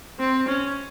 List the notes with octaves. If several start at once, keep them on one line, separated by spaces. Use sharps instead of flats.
C4
C#4